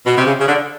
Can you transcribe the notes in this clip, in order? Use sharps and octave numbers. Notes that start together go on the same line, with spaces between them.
B2
C3
C#3
C#3
D3